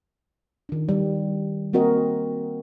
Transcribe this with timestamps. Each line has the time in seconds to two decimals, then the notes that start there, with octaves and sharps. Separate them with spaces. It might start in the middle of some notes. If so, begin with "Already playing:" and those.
0.69 D#3 D4
0.89 G3
1.73 A#3 C4 F#4 A#4 D#5